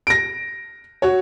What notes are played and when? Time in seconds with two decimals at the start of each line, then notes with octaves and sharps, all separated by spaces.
0.07 A#6 D7
1.02 F#4 C#5